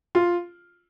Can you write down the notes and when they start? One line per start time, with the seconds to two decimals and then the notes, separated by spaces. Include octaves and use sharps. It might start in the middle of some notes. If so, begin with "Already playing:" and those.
0.15 F4